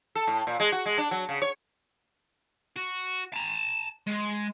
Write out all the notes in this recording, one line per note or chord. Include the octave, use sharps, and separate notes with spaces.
A4
A2
A#2
G#3
F#4
G#3
D4
F#3
C#3
C#5
F#4
A5 A#5
G#3